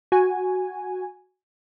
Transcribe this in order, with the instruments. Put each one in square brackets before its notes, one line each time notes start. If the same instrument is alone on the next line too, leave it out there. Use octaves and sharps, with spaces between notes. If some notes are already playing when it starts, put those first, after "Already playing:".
[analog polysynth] F#4 G#5